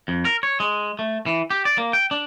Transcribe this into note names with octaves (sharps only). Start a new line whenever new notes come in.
F2
A#4
C#5
G#3
A3
E3
G4
D5
A#3
G5
D4